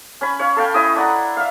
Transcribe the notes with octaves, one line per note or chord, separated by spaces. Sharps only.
C#4 B5
C#5 F5 C#6
A4 F5 G5
C#4 E4 D#5 D#6
D4 F#5 A#5
E5 F5